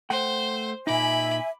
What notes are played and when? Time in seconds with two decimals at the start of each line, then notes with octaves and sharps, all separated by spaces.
0.10 A3 C5 F#5 G5
0.87 A#2 D#4 E5 G#5 B5 D6